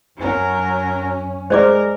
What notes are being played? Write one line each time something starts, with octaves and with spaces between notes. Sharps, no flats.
F#2 F#3 C#4 A#4
G#3 A#4 C5 D5 D6